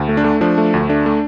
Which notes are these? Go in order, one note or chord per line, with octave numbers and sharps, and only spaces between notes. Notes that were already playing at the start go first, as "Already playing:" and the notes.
Already playing: D2
A3
D4
A3
F3 D4
A3
D2
A3 D4
A3